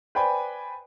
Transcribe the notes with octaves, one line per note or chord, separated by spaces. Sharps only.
B4 C5 D5 G5 G#5 B5